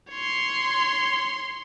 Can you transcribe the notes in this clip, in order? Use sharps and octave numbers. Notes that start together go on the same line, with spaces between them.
C#5 C6